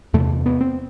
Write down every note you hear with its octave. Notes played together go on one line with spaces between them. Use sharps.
E2 C3 A3
B3
C4